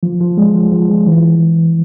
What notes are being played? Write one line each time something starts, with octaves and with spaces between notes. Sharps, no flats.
F3
F3
G#3
F3
F3
G#3
E3